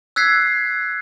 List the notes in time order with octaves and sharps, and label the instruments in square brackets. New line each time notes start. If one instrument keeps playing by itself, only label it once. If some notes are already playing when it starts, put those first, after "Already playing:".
[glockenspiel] E6 F#6 G#6 B6 C7